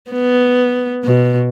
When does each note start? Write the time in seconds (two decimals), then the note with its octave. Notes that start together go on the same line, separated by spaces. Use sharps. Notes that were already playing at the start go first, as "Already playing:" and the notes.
0.11 B3
1.03 B2